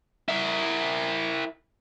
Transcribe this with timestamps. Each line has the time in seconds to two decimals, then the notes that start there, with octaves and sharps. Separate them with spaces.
0.28 E4 A#4